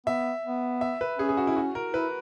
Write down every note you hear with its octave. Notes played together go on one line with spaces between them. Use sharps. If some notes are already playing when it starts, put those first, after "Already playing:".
B3 E5
B3
E5
B4
C#4 G#4
G#4
F#4
E4
F#4
A#4
E4 B4